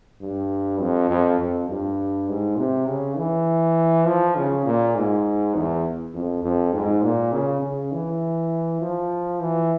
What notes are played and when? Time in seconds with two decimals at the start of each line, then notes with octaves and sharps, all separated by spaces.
0.21 G2
0.80 F2
1.10 F2
1.40 F2
1.69 G2
2.29 G#2
2.58 C3
2.88 C#3
3.17 E3
4.06 F3
4.36 C#3
4.66 A#2
4.95 G#2
5.55 E2
6.14 F2
6.44 F2
6.73 G#2
7.03 A#2
7.33 C#3
7.62 C#3
7.92 E3
8.81 F3
9.40 E3